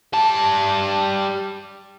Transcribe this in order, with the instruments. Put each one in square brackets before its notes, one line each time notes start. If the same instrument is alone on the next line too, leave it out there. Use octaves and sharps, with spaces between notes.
[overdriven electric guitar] G3 A5